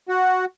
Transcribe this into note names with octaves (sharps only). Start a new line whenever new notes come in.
F#4